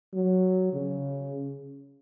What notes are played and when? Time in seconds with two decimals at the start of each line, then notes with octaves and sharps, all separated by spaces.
0.14 F#3
0.73 C#3